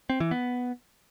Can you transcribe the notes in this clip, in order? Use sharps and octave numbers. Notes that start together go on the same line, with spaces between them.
C4
E3
B3